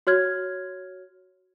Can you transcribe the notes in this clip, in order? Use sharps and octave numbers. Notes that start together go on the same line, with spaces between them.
F#4 C#5 F6 G#6